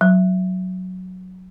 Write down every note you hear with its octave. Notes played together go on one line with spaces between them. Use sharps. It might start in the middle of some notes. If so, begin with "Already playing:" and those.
F#3